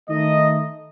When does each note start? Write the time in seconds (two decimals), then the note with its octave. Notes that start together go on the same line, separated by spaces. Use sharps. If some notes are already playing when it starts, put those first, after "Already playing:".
0.09 D#3 A3 D#4 D#5